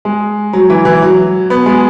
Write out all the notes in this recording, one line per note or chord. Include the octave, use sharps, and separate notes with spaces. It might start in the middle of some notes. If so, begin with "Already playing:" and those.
G#3
F#3
E3
E3
F#3
B3
G#3